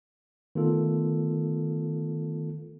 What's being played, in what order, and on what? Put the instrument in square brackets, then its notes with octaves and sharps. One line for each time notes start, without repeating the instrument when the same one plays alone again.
[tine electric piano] D#3 A3 B3 F4 A4